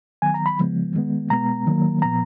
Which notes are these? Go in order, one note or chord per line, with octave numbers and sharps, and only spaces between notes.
D#3 F#3 B3 G#5
A#5
B5
C#3 F3 G#3 B3
D#3 G#3 B3
B2 G#3 B3 A#5
D#3 F#3 A#3
A#2 F3 B3 A#5